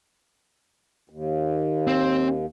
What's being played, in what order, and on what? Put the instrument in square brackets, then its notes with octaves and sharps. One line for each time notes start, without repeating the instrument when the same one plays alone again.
[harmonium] D#2
[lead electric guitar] C4